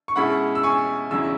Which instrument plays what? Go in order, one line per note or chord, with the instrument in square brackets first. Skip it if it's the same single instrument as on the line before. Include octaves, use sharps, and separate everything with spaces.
[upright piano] C#6
B2 G#3 C#4 E4 F#5 B5
E6
G#5 C#6
E2 C#3 F#3 E4 E6